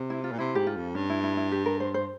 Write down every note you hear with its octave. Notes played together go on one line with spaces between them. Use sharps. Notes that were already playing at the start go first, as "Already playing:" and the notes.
Already playing: C3
E4
F4
A#2
C3 E4
G#2 G4
F4
F2
G2 C#4
E4
E4
E4
G4
A#4
C5
C5